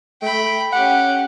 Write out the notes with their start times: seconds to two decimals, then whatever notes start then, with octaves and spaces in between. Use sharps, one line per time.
0.22 A3 G5 B5
0.73 C#4 G4 F#5